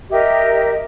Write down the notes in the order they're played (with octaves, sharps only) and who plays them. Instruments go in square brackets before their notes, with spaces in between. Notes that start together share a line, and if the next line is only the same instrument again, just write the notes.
[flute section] G4 A#4 D#5 E5